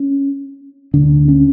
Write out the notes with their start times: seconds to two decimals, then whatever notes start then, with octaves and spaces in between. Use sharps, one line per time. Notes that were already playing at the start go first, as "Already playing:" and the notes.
Already playing: C#4
0.94 D2 D3 D4
1.28 C#4